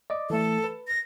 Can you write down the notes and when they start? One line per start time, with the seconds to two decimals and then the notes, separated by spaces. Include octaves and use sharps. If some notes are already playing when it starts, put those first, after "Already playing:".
0.10 D5 D#5 D6
0.30 E3 A3 A4
0.64 B4
0.88 A#6